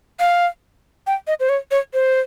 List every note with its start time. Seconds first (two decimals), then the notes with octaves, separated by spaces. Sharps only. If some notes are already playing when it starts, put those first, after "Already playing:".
0.20 F5
1.07 G5
1.27 D#5
1.40 C5
1.49 C#5
1.71 C#5
1.94 C5